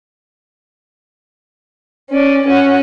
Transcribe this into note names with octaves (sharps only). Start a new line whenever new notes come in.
C#4 D5
C#4 F#4